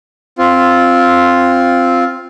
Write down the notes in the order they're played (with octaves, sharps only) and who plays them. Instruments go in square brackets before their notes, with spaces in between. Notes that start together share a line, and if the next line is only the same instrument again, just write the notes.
[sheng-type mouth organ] C4 F4